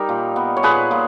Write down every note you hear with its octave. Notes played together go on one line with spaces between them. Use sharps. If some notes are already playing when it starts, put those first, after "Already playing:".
Already playing: G3 D#4 G4 A#4
A#2
B3
C#5
A#2 G#4 B4
A#2